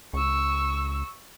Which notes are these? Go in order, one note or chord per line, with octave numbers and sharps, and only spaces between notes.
C#2 C#6 E6